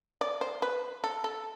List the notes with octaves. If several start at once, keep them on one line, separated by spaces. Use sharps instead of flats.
D5
C5
B4
A4
A4